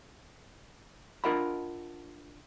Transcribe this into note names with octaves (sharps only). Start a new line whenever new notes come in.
D4 F4 A#4 D#5 F#5 B5